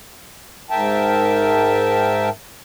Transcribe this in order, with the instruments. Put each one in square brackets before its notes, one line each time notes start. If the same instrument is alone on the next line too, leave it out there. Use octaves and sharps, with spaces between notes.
[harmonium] G#2 A#4 E5 G5 A5